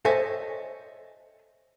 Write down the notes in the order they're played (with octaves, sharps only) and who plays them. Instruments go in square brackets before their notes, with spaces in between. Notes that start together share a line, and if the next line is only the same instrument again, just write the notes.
[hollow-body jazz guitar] A4 C5 C#5 D#5 E5 G#5